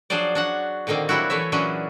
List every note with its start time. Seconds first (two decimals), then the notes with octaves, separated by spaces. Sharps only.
0.10 F3 F#3 D4 G#4 C5 D5
0.35 D4 F#4 F#5
0.87 A#2 D3 D#3 A#3 C4
1.09 F#3 G3 D4 E4 F#4
1.30 E3 A3 C#5 E5
1.52 A#2 E3 F#3 C#4 D4 G#4